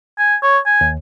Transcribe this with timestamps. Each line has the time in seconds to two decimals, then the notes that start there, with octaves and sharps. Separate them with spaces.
0.18 G#5
0.43 C#5
0.66 G#5
0.81 D#2